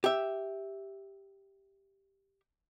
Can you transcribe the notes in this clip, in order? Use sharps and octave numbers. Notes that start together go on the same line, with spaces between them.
G4 E5